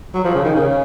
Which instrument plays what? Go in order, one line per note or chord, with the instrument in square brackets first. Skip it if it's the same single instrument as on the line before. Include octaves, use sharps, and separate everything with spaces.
[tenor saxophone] F#3
F3
C#3
D#3
C#3